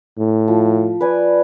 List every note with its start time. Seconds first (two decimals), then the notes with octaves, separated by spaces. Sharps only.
0.18 A2
0.48 F3
1.00 B4 D5 G#5